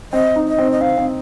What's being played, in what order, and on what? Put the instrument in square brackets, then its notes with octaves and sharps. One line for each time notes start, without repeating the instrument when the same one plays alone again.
[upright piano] C4 [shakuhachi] D#5
[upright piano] D#4
[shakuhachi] D#5
[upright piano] C4
[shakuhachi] D#5
[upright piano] C4 [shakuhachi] F5
[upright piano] C4